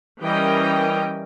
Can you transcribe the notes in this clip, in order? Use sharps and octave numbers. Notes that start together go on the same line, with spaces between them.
E3 G3 C#4 A#4 D#5 G5